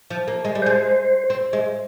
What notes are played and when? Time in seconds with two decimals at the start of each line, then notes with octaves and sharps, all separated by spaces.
0.10 F3
0.28 A#3
0.45 G#3
0.55 G3
0.62 G#3 C5
1.30 C4
1.53 G#3